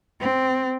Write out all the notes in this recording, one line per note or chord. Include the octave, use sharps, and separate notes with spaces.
C4